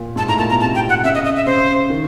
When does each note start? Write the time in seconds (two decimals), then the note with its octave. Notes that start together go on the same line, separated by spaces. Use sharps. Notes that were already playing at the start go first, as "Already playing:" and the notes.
Already playing: A#2
0.16 G#2 A5
0.27 A2 A#5
0.38 A#2 A5
0.50 B2 A#5
0.60 C3 A5
0.75 G5
0.89 F#5
1.04 C#3 E5
1.14 D#5
1.25 D#5
1.36 E5
1.46 C#3 C5
1.90 D#3